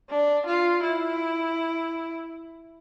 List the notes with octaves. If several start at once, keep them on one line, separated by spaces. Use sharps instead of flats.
D4
F4
E4